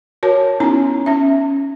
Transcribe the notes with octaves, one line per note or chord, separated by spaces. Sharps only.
F#4 A#4 C#5 A5
B3 C#4 D#4 E4 A#5
C#4 E5